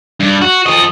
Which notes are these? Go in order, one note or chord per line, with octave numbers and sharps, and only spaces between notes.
G2
F#4
F3 D#5